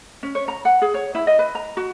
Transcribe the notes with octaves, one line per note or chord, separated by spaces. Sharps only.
C#4
C#5
A#5
F#5
G#4
C#5
E4
D#5
B4
A#5
F#4